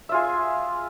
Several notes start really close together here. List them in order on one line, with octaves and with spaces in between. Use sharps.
E5 F4 G#4